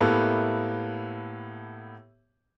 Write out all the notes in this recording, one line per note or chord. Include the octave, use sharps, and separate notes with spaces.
A2 A#3 B3 E4 G4 A4